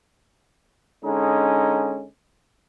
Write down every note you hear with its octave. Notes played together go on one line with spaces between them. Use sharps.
D3 G#3 C#4 D#4